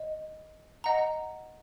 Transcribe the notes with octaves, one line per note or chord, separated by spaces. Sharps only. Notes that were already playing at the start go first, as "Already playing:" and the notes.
Already playing: D#5
D#5 F#5 A#5